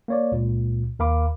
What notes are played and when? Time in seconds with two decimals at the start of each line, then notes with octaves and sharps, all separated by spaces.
0.08 A#3 C#5 D5
0.32 C#2 A#2
0.99 D#2 A#4 F5 B5 D6